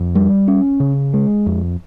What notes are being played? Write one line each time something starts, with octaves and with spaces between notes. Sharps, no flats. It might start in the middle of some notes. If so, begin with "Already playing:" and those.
Already playing: F2
G3
C#4
C#3
G#3
F2